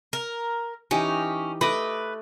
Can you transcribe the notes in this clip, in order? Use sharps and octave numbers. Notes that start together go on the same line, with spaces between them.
A#4
E3 C#4 D#4 G4
A3 B4 D#5 D6